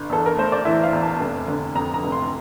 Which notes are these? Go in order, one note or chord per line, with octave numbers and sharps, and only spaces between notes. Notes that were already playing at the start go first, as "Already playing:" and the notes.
Already playing: G1
E2 A4
A#4
A3 C5
D5
E3 E5
F5
E2
A5
F1
D3
F2 A#5
A#5
F1
C6